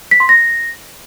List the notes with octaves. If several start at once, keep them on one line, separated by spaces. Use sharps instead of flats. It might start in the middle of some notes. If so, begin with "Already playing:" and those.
B6
C6
A#6